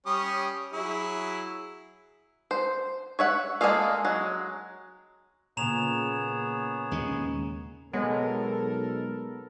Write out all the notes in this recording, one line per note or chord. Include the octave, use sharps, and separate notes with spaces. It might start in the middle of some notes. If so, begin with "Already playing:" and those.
G3 C#4 D#6
F#3 E4 G#4
C5
C#5 E5 F#5
G#3 A#3 G#4 A4 F5
F#3 G#3
A#2 C#3 B3 G#4 C#5 A#5 E7 F7
D#2 G#3 C#4
B1 G#3 B3 A4 A#4 C#5 F#5